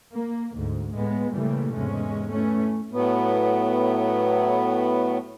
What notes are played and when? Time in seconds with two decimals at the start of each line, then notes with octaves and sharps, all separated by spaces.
0.13 A#3
0.52 D2 G#2
0.92 A2 G#3 B3
1.32 A#2 C#3 E3 G3 A3 A#3
1.74 E2 G#2 C3 G#3 C#4
2.29 E3 A3 C#4
2.92 A2 F#3 B3